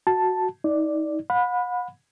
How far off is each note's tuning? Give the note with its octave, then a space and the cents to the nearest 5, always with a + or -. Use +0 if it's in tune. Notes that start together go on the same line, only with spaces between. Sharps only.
F#4 +0 A5 +0
D#4 +30 D5 +0
F#5 -40 B5 +0